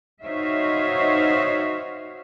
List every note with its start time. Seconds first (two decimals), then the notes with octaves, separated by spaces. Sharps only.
0.22 D#4 F#4 C5 C#5 E5 F5